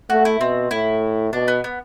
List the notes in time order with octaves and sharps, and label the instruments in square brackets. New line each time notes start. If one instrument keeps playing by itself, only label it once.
[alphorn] A3 [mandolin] F#4
[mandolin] E4
[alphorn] B2 [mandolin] C4
[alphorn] A2 [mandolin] E4
[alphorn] B2 [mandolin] D4
[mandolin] B3
B3